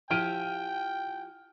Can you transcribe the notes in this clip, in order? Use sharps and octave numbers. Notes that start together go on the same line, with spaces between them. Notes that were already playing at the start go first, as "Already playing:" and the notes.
F3 E4 G4 G5 F6 D7 D#7